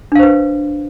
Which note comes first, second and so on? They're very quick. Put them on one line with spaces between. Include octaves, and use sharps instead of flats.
D4 F5 C5 B4